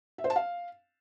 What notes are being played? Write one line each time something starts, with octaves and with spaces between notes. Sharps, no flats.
E5
C5
A5
F5